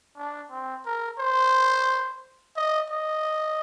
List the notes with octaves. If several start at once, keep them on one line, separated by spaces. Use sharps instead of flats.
D4
C4
A#4
C5
D#5
D#5